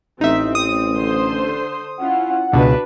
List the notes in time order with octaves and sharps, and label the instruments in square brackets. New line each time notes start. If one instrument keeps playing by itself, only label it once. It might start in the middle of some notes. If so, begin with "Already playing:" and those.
[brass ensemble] A1 [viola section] C4 [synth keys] D#4 E5
[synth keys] D#6
[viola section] D3 C5 C6
[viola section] C#4 E4 F4 [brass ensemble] F#5
[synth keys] C#2 B2 [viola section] D4 F#4 B4